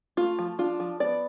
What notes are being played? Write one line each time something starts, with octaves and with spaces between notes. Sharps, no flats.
A3 F4
F3
D4 F4
F3
B3 D5